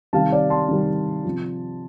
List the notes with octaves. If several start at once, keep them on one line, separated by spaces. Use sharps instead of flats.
C3 D#3 G3 F5 A5
D5 F5
A5 C6
C3 D#3 G3
C3 F3